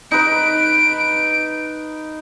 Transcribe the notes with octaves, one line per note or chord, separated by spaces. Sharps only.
D#4 B4 D7